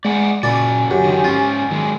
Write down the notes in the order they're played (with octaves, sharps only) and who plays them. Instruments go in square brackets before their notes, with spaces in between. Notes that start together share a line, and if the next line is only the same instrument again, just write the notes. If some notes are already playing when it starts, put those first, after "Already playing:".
[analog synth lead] G#3 [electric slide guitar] D5 F#5 G#5
[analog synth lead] A#2 [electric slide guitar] C#3 C#4 F#4 [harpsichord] D5 B5 [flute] G#5
[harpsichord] F#2 [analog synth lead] G4
[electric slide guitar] D3 D#3
[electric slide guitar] G#2 C#4 [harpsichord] F4
[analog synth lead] D#3 [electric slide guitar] F#3 G#3